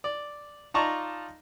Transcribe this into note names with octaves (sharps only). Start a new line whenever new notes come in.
D5
D#4 F4 D5 A5 A#5 C#6